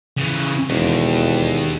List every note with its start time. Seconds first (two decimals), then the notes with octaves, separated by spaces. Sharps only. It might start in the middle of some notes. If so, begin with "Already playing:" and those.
0.17 C#3 E3
0.68 E1 D#2